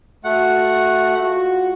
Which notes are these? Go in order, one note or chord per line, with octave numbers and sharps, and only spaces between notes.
A3 F#4 F#5
G#3 F4 F#4